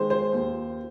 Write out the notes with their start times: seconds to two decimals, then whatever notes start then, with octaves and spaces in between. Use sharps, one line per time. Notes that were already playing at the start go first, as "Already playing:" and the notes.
Already playing: D#3 G#3 C5
0.10 C5
0.33 D#2